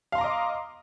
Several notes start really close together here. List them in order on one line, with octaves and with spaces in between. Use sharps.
F5 C6 A#5 D6 D#5